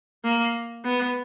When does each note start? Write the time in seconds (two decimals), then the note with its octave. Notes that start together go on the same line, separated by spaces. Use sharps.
0.24 A#3
0.84 B3